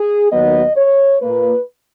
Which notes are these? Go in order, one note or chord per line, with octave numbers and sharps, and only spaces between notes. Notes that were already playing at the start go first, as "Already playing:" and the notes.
Already playing: G#4
D#2 D#3 F#3 B3 D#5
C#5
A#2 A#3 B4